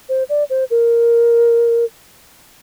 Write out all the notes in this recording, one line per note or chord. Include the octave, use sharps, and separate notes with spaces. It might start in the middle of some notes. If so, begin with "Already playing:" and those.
C5
D5
C5
A#4